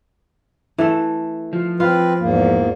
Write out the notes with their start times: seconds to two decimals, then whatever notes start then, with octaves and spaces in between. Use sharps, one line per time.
0.78 E3 A3 A4
1.53 F3
1.80 C4 F4 B4
2.19 E2 G#2 A#3